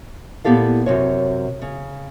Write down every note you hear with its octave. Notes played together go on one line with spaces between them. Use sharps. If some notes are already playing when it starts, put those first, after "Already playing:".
A#2 B3 E4 G4 A4 F5
F#2 C3 C#5
C#3